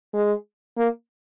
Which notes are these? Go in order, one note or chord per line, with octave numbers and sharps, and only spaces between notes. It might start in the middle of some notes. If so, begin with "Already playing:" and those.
G#3
A#3